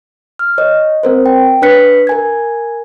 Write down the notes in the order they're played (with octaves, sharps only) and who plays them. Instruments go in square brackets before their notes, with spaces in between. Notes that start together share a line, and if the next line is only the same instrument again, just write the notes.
[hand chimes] F6
C#5 D#5
C4 A#4 C5
G5
D4 B4 C#5 F#6 B6 C#7
A#4 G#5 G#6